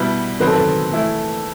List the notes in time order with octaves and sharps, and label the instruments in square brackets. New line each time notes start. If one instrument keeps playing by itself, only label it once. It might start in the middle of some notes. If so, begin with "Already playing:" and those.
Already playing: [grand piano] B2 G3 B3 E4
[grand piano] D#3 F#3 C4 [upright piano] B4
[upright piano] A4
B4
[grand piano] E3 A3 E4